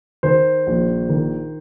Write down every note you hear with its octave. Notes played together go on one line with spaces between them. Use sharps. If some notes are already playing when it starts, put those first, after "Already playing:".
D#3 C5
A#1
D#3